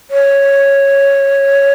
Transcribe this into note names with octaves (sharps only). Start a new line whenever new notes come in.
C#5